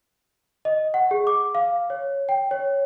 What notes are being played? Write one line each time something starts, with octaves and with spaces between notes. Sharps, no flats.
D#5
F#5
G#4
D6
F5
C#5
G5
C#5